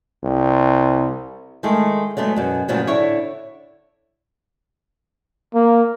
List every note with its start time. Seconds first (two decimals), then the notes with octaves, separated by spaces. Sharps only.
0.24 C2
1.63 D#3 G#3 A3
2.17 F#3 G#3 A3 B3
2.36 F#2 B2
2.68 A#2 C#3 F3 F#3 B3
2.87 D3 E4 C#5
5.54 A#3